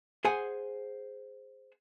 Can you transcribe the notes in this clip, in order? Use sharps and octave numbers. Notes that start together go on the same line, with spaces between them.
G#4 C5 F#5 G#5